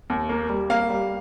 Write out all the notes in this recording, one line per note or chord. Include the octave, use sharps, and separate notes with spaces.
D#2
A#3
G3
A#3 F5
G3